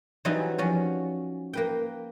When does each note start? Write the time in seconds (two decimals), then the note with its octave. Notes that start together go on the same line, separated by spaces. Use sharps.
0.25 E3 F#3 G3 C4 D#4 G#5
0.58 F3 F#3 C#4
1.53 A#3 B4 G5